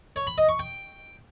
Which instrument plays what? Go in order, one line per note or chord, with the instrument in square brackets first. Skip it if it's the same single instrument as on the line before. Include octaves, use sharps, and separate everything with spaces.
[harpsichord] C#5
B5
D#5
C#6
G5